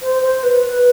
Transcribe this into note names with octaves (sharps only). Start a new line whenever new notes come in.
C5
C5
B4
B4